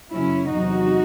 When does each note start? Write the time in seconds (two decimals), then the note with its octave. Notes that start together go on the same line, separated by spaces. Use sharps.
0.11 F#2 C#3 F#3 C#4 E4
0.54 E2 C3 F#3 D#4 F#4